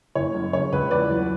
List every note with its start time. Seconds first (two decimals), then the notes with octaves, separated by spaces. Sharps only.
0.15 F#1 C#5
0.34 F#2
0.53 C#3 C#5
0.72 C#2 B4
0.91 E2 B4 D5
1.11 F#3